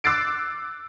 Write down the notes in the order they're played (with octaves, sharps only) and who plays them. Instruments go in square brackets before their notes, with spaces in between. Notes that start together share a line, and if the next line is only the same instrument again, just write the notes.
[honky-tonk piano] D6 E6 F#6 A6 C7 D7